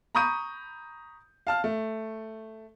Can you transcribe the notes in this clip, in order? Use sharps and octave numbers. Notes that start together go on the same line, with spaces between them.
A#5 B5 C#6 D#6 G6 D#7
F5 A5 F6
A3